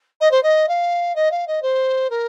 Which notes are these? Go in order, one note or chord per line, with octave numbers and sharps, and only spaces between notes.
D#5
C5
D#5
F5
D#5
F5
D#5
C5
A#4